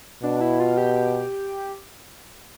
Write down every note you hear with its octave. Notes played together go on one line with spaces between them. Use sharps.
B2 D4
E4
F4
G4